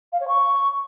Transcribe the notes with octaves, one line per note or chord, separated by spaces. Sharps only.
F5
C#5
C#6